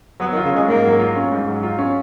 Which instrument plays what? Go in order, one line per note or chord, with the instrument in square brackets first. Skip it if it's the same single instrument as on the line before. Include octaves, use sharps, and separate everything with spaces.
[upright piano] F#3 [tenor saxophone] B3
[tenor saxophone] D#3
[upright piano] F4
[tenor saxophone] C#3
[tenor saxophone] G#3 [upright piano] C#4
[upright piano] G#2 [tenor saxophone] A#3
[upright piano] F#3
F4
C#4
G#2
F#3
F4
C#4